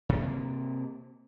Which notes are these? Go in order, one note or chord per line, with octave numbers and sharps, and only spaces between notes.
C3 A#3